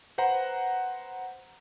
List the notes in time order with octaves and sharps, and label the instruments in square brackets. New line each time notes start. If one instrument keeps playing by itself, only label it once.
[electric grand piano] B4 C5 F#5 A#5